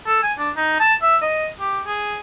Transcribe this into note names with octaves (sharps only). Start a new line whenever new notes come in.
A4
G#5
D4
D#4
A5
E5
D#5
G4
G#4